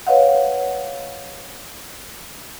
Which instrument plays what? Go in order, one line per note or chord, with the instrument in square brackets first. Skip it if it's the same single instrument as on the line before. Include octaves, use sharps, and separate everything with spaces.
[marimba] B4 C#5 D#5 F5 F#5